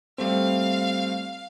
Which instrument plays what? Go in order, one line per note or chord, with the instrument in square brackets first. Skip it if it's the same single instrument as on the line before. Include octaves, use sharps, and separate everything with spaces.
[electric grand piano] G3 A3 C4 [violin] F5